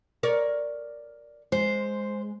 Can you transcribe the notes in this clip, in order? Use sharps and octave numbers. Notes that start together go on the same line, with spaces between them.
A#4 C#5 D5
G#3 C5